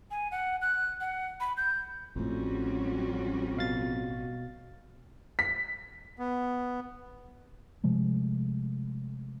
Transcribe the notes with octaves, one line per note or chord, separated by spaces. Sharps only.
G#5
F#5
F#6
F#5
B5
G6
A1 F2 A2 G3 C#4 F#4
B2 F5 A6
B6
B3
C3 F3 G#3 A3